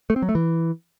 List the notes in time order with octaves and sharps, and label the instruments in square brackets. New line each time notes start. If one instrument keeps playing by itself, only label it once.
[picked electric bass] A3
C4
F#3
A3
E3